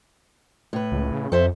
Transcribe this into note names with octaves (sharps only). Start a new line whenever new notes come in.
A2 B4
C#2
C#3
F2 A4 C5 E5